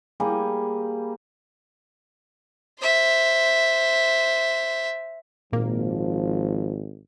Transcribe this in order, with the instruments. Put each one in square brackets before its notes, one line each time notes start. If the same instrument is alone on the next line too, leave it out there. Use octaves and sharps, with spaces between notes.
[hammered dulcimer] G3 A#3 G#4 G#5
[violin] C5 E5
[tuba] G#1 [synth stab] A#2 A#3 [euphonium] F3